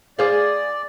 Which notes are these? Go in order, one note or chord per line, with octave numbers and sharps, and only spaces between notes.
G#4 C5 D5 F5